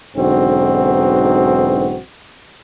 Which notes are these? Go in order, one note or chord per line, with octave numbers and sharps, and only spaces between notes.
B1 G#2 D3 E3 C4 F#4